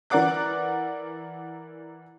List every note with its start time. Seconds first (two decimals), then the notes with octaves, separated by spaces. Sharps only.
0.10 E3 A#4 D5 F#5 D6 F#6